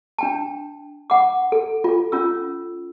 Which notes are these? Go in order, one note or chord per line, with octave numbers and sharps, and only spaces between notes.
D4 G5 A5
F#5 D6
A4
F4 A4
C#4 F4 E6